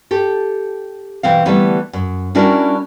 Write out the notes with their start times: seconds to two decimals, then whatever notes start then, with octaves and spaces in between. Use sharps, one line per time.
0.11 G4 A4
1.23 B2 E3 C4 F5
1.45 D3 E3 G3 A3 B3
1.93 F#2
2.35 G3 C#4 D4 E4 F#4 A#4